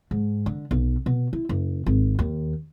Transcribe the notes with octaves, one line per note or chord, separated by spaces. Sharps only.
G#2
D3
B1
B2
E4
F#1
G#1
D#2